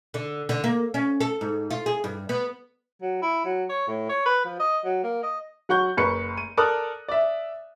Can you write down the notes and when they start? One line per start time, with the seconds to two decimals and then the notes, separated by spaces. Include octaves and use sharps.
0.14 D3
0.49 D3
0.64 A#3
0.94 C#4
1.21 A4
1.41 G#2
1.71 F4
1.86 G#4
2.04 G2
2.29 B3
3.02 F#3
3.22 E4
3.45 F#3
3.69 C#5
3.88 A2
4.09 C#5
4.26 B4
4.45 F3
4.60 D#5
4.84 F#3
5.03 A#3
5.23 D#5
5.69 F#3 F#5 C#6 G6
5.97 F#1 B4 C#6 C#7
6.37 D#7
6.57 A4 A#4 D5 D6 D#6 F#6
7.08 D5 E5